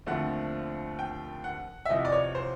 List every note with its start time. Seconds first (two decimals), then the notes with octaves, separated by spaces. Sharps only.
0.06 D#2 D3 F3 A3 C4 F#5
0.99 G5
1.44 F#5
1.85 E5
1.90 E2 C3 F3 D#5
2.05 D5
2.12 C#5
2.35 C5